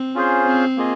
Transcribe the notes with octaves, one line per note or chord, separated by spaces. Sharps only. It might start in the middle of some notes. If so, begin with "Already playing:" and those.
Already playing: C4
C#4 F4 G#4 C5
C4
A#3 F4 G#4 D#5